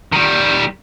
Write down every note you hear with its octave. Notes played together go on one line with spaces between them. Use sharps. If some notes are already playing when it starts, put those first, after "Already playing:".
D#3 G3